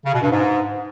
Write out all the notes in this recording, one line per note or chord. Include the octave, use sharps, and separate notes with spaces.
C#3
B2
G2
G#2